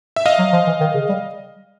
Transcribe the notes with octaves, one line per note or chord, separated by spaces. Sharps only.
E5
D#5 F5
F#3
F3
E3
D#3
C#3
G3